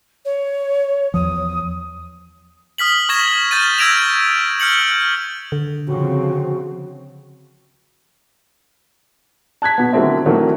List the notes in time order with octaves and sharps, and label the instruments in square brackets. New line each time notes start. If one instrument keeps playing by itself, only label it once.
[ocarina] C#5
[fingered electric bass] E2 F3 [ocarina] D#6
[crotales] D#6 F6 B6 F#7
C#6 F6 G#6 A#6 E7 F#7
F6 G6 A6 D#7
E6 G#6 A#6 D7 E7 F7
F6 G6 C#7 F#7
[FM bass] D3
[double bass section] C#3 F3 C4 [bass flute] F#4
[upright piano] A5 F#6 G#6 B6
B2 B3
D3 D#3 F#3 A3 C4 E4
D#3 E3 F#3 A3 A#3 C4